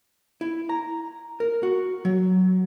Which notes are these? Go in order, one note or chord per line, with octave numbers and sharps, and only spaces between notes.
E4
A#5
A#4
F#4
F#3